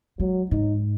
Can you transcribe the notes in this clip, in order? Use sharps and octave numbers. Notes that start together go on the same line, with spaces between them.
F#3 G#3
G#2 D#4